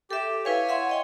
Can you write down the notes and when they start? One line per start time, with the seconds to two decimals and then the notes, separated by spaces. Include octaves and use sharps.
0.11 G4 A4 E5
0.45 E4 B4 C#5 F5 G#5
0.69 E5 F#5 C6
0.89 D#5 G5 C6